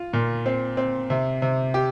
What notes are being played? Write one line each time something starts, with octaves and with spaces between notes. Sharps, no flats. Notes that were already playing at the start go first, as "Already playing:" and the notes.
Already playing: F4
A#2
C4
C4
C3
C3
G4